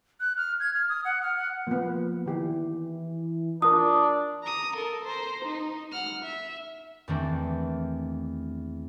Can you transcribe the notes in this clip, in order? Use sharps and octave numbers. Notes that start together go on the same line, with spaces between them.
F#6
F6
G#6
F6
D#6
F#5
F6
F#5
F3 A#3 B3
D#3 E3 G4
D4 F4 A#4 D#6
A#5 D#6
A4 A#4
C5 A#5
D#4
F#5 F6
E5
E2 D#3 A3 A#3 C4 D4